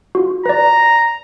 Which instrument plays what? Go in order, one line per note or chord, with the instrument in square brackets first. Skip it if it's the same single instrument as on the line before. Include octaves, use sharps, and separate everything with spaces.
[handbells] F4 F#4
[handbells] B4 D5 [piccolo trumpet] A#5